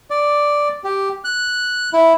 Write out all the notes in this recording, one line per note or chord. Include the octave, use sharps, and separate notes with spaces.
D5
G4
F#6
E4